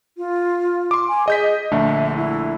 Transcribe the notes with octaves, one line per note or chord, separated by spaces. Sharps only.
F4
C6 D6
G#5
G#4 D#5 G6 B6
A#1 D3 A3 E5
E4